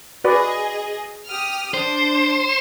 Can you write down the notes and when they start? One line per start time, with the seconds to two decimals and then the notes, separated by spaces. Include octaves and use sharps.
0.24 F#4 G#4 B4 D5 D#5
1.28 G4 D#6 F6
1.74 D4 C5